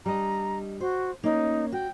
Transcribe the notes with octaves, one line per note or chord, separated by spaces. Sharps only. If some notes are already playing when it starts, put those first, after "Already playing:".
G3 D4 D#5 A#5
F#4 C5
A#3 C#4 D#4
F#4 G5